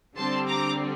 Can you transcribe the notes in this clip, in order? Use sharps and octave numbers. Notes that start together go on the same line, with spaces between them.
D3 G3 C4 A5 C6
A#5 D6